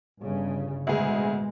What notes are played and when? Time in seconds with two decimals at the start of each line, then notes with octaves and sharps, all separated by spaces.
0.22 G1 C#3
0.87 A1 D2 B2 G#3 G#4